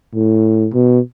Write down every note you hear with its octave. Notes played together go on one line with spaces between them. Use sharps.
A2
B2